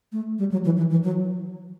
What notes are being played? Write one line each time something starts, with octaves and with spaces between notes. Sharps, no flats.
A3
G3
F#3
E3
E3
E3
F#3